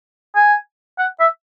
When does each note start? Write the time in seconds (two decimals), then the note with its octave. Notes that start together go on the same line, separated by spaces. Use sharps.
0.36 G#5
0.98 F#5
1.20 E5